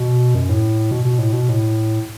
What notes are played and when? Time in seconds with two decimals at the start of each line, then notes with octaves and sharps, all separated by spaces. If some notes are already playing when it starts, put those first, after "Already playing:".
Already playing: B2
0.35 F#2
0.49 A2
0.91 B2
1.05 B2
1.18 A2
1.33 B2
1.48 A2